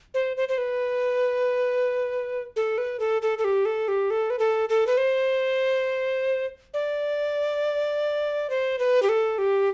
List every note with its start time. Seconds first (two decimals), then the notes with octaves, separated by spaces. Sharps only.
0.14 C5
0.37 C5
0.49 C5
0.58 B4
2.56 A4
2.78 B4
3.00 A4
3.22 A4
3.38 A4
3.44 G4
3.65 A4
3.88 G4
4.10 A4
4.30 B4
4.39 A4
4.69 A4
4.87 B4
4.97 C5
6.74 D5
8.50 C5
8.79 B4
9.03 G4
9.09 A4
9.38 G4